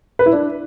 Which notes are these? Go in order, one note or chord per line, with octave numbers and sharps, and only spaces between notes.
B4
E4
D4